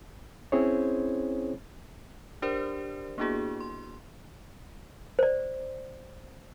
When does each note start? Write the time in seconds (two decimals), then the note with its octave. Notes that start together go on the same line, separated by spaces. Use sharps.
0.52 C4 C#4 E4 G#4 C5 C#5
2.42 D4 G4 A#4 C5 D5
3.18 A#3 B3 D4 E4 F#4 G#4
3.60 C6
5.19 C5 D5